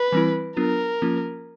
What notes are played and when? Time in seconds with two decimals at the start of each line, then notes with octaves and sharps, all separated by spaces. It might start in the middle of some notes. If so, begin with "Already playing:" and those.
Already playing: B4
0.12 E3 G3 C4 E4
0.57 F#3 B3 D4 F4 A#4
1.02 F3 A#3 C#4 F4